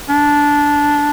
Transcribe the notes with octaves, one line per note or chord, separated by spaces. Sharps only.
D4